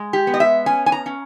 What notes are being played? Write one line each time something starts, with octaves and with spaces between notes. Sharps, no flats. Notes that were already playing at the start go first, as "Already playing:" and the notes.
Already playing: G#3
G4
B3
D#5
E5
C#4 G#5
G#5
A#5
C#4